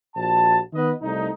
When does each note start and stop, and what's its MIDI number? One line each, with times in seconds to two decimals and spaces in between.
0.16 0.59 34
0.16 0.59 66
0.16 0.59 81
0.73 0.91 51
0.73 0.91 59
0.73 0.91 71
0.73 0.91 75
1.02 1.29 36
1.02 1.29 57
1.02 1.29 63